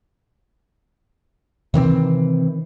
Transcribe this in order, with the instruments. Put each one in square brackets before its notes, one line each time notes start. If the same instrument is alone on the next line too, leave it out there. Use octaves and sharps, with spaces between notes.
[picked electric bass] C3 D#3 E3 C4